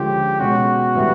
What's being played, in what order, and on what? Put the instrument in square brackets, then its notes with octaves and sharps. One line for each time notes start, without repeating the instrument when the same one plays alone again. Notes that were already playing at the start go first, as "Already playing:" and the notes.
Already playing: [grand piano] D3 F3 G#3 C#4 F4 [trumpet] G4
[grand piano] B2 G#3 C#4 [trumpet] F#4
[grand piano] A2 E3 G3